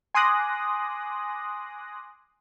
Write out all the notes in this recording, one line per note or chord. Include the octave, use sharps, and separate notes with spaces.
G#5 C6 D6 D#6 F#6 A#6